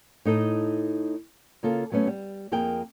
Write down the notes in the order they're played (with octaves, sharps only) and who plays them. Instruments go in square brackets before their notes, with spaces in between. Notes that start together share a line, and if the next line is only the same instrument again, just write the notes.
[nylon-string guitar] A2 D#4 A4 D#5
C#3 A#3 F4 A4
F#3 A3 B3 C#4
G3
F2 A#3 G#4 A#4 G5